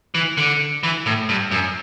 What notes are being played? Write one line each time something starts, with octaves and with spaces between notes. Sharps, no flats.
E3
D3
E3
A2
G2
F#2